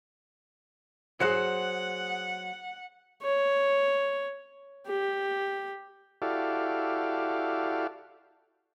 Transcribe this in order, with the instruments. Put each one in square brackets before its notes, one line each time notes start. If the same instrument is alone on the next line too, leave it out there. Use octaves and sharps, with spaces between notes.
[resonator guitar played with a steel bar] F#3 C5 [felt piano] G#4 F#6 C#7 [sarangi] F#5
[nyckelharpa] C#5
G4
[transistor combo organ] E4 F#4 G4 A4 D5 F5